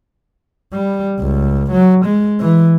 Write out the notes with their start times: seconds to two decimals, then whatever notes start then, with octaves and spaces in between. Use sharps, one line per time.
0.73 G3
1.19 C#2
1.71 F#3
2.05 G#3
2.40 E3